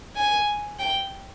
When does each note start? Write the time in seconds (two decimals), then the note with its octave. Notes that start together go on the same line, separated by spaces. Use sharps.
0.16 G#5
0.79 G5